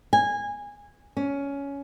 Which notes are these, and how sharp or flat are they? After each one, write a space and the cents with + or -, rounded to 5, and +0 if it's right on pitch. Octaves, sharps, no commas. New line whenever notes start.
G#5 -20
C#4 +15